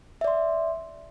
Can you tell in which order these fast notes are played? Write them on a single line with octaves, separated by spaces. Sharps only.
E5 D5 C6